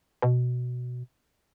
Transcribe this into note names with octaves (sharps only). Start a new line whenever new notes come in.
B2